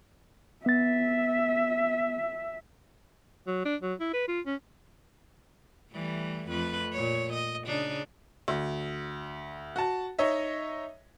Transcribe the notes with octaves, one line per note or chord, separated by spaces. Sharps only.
B3 E5 A6
F#3
D4
F#3
E4
B4
F4
C#4
E3 G3 A3
F2 A3 B4
A#2 C#5
D#5
C#3 D4 D#4
D2
F#4 A5
D#4 C#5 D#5 E5